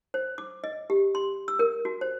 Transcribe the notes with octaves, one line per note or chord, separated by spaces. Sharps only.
C5
D6
D#5
G4
C6
E6
A#4
F#4
C5